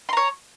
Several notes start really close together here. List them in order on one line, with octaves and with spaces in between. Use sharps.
C6 A#5 C#5